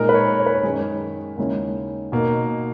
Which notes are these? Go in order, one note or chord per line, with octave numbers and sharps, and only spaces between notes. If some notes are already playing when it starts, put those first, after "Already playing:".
Already playing: A#2 G#3 D#4 A#4
B4
C#5
C#5
B4
C#5
F#2 D#3 G#3 G#4
D#2 C#3 G#3 C#4 E4
B2 A#3 D#4